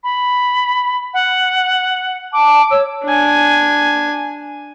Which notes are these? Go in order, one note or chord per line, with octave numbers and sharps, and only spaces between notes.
B5
F#5
A5 D6
C#5 E6
D4 G#5